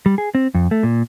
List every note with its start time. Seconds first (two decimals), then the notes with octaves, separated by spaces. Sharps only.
0.06 G3
0.18 G#4
0.35 C4
0.54 F2
0.71 A3
0.83 A#2